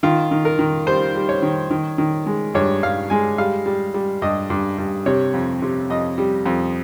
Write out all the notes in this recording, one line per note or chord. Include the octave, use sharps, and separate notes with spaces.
D#3 F4
D#3
A#4
D#3
G3 C5
G3
C#5
D#3
D#3
D#3
G#3
G2 C#5
G2 F5
G#3 G#5
G3 F5
G3
G3
G2 D#5
G2
G2
C3 C#5
F2
C3
F2 D#5
G3
F2